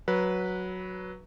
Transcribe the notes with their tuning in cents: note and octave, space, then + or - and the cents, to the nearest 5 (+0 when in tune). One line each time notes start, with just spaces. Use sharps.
F#3 +0 B4 -15